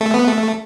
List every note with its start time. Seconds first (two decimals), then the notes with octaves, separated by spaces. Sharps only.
0.01 A3
0.14 B3
0.27 A3